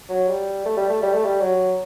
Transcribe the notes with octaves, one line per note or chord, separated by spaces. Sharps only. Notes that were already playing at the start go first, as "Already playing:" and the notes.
F#3
G3
A3
G3
A3
G3
A3
G3
F#3